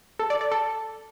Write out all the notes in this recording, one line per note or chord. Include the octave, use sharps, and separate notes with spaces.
A4
D5
D5
A4